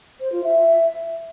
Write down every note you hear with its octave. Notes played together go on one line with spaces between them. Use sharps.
C5
F4
E5